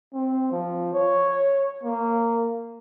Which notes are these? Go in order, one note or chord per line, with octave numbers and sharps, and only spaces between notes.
C4
F3
C#5
A#3